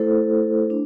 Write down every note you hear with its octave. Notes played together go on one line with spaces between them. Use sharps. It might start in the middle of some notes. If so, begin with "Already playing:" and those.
Already playing: A3 E4 A4 C5
D4